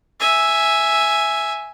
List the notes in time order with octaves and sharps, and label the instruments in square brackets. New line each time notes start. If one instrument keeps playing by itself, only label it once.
[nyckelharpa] E5 G#5